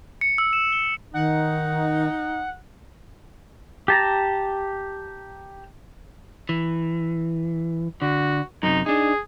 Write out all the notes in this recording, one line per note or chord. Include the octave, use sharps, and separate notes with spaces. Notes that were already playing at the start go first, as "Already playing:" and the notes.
C#7
E6
E7
G7
D#3 D#4 F#5
G4 A5 A#5
E3
D3 F#4
F#2 C3 D#4
D4 D#4 G#4